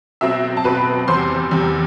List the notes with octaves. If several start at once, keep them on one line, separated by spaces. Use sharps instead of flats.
B2 F#3 C4 E5
A5
B2 F#3 C4 B4 B5
E2 C3 G3 C5 C6
E2 C3 G3